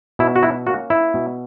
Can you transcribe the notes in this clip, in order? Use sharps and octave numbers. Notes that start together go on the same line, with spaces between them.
B2 E4
F#4
E4
A#3 C#4 F#4
E4
B2